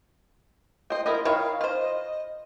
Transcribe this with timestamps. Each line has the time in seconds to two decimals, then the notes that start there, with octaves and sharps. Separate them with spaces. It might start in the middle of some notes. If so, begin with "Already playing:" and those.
0.90 C5 D#5 G5
1.06 E4 F4 A#4 D#5
1.25 D#3 E4 C#5 F5
1.61 F4 C5 D#5